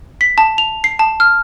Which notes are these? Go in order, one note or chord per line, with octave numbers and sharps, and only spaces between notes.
B6
A5
F7
C7
A5
F6